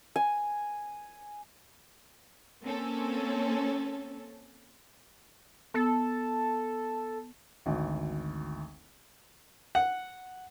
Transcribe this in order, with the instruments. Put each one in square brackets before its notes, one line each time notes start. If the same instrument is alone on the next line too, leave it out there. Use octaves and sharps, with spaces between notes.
[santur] G#5
[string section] A#3 C4 C#4 A4
[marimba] B3 [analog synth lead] A4
[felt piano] G#1 D2
[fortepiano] F#5